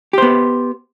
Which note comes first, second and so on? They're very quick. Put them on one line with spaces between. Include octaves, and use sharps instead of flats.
G4 C5 B3